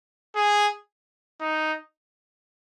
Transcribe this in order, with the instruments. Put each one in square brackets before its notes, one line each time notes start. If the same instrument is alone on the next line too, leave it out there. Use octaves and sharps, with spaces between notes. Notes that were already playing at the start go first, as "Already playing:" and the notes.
[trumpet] G#4
D#4